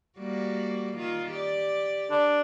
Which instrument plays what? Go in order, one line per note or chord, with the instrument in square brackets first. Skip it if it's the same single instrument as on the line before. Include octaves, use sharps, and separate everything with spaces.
[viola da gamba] G3 A#3 F#4
D#3 F4
G4 D5
[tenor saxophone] D4